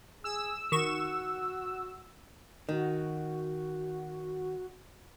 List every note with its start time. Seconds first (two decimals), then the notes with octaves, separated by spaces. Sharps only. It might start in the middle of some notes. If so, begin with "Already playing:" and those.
0.24 G#4 E6
0.72 D#3 F#4 C#6 E7
2.69 D#3 F#4